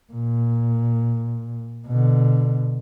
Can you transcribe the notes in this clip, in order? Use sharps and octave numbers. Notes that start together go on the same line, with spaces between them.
A#2
B2 D3